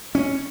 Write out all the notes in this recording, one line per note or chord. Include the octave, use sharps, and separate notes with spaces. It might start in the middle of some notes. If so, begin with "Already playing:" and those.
C#4